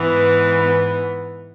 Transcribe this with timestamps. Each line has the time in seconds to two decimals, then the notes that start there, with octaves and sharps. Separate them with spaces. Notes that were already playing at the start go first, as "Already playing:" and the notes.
Already playing: G#2 E3 B3
0.59 B3